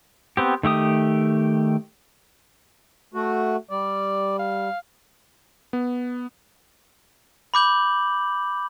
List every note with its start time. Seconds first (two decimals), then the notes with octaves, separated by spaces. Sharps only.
0.37 B3 C4 G4
0.63 D#3 A3 G4 D#6
3.14 A3 F#4
3.71 G3 D5
4.39 F5
5.73 B3
7.54 B5 D6 G6 F#7